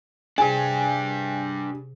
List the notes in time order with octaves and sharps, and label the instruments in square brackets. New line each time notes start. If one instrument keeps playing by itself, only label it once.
[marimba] C3 G#4 [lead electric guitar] D4 G4 [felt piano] G#5